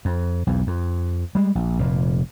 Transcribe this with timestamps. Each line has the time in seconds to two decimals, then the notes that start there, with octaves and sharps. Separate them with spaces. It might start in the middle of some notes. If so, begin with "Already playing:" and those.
0.05 F2
0.47 B1 E2
0.67 F2
1.35 G3 G#3
1.55 A#1
1.79 F1 A#2